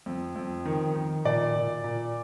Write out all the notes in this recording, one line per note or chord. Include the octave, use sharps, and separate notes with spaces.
F2
F2
D#3
D#3
A#2 D5
A#2
A#2